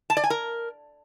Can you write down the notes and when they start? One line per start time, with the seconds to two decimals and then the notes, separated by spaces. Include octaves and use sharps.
0.10 A5
0.17 D5
0.24 G#5
0.30 A#4